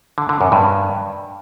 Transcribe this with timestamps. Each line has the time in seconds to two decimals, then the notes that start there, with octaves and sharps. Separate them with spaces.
0.18 D3
0.29 D3
0.41 F#2
0.52 G2